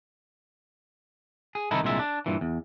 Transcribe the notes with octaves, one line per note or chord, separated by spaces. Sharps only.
G#4
C2 D#3 D#4 E4 A4
C2 A#2 D3 G#3 E5
D4
G2 A#2 E3
E2